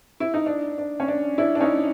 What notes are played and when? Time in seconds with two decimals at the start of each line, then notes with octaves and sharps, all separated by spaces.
0.20 E4
0.34 D#4
0.46 D4
0.78 D4
1.00 C#4
1.08 D4
1.38 D4 E4
1.55 D4
1.60 C#4 D#4